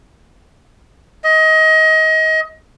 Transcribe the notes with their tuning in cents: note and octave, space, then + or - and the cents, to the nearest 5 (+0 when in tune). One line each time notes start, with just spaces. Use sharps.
D#5 +25